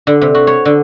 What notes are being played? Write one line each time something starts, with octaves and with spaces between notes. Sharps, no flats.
D3
C3
F#4
C#5
D3